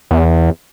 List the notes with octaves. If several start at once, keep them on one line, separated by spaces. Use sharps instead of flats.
E2